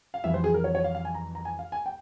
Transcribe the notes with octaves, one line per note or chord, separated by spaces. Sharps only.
F5
F2 E3 G3 E5
C5
G#4
A#4
C#5
C#5
F5
F5
G#5
A#5
A#5
G#5
F5
G#5
G5